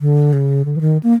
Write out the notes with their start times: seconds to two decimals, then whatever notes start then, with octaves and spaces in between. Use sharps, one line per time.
0.01 D3
0.33 C#3
0.65 D3
0.76 E3
0.81 D#3
1.03 A#3